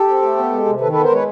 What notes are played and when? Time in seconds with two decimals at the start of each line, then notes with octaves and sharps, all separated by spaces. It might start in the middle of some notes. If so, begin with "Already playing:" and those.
Already playing: G4 A4
0.08 C4
0.22 A3
0.37 B3
0.52 G#3
0.66 C3
0.81 D#3 A4 B4
0.92 B3 A4 B4
1.03 A#4 C5
1.10 G#3 B4 C#5